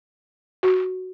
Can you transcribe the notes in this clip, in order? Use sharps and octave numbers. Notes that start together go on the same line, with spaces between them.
F#4